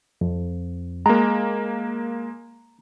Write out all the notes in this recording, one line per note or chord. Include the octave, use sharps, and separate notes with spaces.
F2
G#3 A#3 A#5